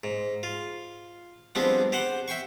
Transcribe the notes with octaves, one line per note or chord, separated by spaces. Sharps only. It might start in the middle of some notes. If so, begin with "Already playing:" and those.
G#2
F4
F3 G3 G#3 B3 C4 D4
G4 C5 F#5
E5 G5 C6 C#6